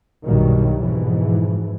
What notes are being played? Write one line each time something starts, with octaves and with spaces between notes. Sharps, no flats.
B1 G2 B2 D#3 F#3 G3
F2 G#2 B2 E3